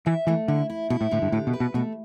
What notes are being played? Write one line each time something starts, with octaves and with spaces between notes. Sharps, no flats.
E3 E5
E3 A3
D3 E4
E4
B2 E4
A2
A2 D3
G2
A2 G4
B2
B4
B2
B2 A3